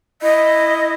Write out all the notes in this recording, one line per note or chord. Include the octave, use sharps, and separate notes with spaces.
E4 D#5